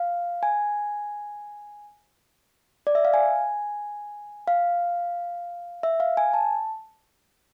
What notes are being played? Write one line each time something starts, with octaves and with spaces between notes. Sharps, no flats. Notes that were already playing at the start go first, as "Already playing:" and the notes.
Already playing: F5
G#5
D5
E5
F5
G#5
F5
E5
F5
G#5
A5